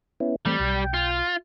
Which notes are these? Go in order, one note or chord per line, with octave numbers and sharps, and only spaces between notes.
B3 C#4 E4
E3 G3 A3 C4 G5
B1
F4